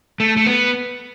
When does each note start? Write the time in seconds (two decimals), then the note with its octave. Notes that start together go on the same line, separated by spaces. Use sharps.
0.20 A3
0.37 A3
0.46 B3